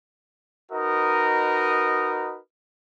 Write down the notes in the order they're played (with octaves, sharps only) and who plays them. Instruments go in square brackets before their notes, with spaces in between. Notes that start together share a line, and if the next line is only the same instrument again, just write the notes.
[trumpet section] D#4 F#4 A#4 B4 D#5